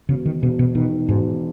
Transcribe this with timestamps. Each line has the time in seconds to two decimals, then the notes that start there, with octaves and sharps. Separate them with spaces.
0.09 E1 C#3
0.26 D#3
0.42 E1 B2
0.59 B2
0.75 B2 D#3
1.09 E1 G#2